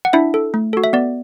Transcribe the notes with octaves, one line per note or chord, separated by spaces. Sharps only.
F#5
D4 E4 E5
A4
A3
F#4 A4
E5
B3 D5